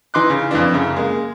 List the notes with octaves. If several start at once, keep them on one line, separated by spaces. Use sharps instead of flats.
E3 D#4 C6 D6 F#6
C#3
F2 E3 D4
F#2 C#3
G#3 A#3